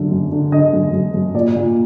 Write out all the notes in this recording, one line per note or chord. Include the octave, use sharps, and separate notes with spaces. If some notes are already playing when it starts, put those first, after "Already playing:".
Already playing: F#2 D3
F#2
D3
D3 D#5
F#2
F#2
F#2
A#2 D5
A#2